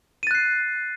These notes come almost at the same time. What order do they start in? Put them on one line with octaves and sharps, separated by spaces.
D#7 A6 F#6 C7